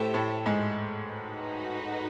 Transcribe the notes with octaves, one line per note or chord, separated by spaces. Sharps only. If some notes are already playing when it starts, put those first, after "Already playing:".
Already playing: A2 A3 G4 C5 E5
A2 A3
G#2 G#3
D#4 F#4 B4